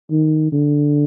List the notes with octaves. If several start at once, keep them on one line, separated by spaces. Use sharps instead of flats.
D#3
D3